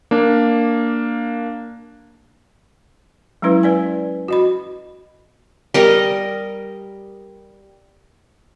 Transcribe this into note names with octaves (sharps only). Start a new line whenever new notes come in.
A#3 D4
F#3 G#3 C#4 E4 B4
B4 D5 G#5
F#4 D#5 B5
G3 A#4 D#5